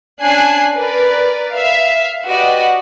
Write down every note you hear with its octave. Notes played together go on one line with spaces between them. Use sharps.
C#4 D4 G#5 F#6 C7
A#4 B4 D5
E5 F5
F#4 G4 B4 D5 D#5 F#5